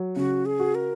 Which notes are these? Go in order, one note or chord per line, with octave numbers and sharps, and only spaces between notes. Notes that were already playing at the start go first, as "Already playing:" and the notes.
Already playing: F#3
C#3 F#4
G#4
F#4
A#4